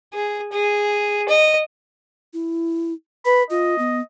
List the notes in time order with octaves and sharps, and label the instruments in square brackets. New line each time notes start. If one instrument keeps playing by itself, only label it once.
[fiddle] G#4
G#4
D#5
[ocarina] E4
[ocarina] B4 [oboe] B5
[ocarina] F4 [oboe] D#5
[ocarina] B3